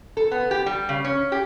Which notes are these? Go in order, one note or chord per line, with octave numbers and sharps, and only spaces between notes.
A4
B3
G4
G3
C#3
C#4
G4